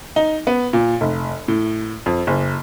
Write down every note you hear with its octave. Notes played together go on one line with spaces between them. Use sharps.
D#4
B3
A#2
F1
A2
F2
F#1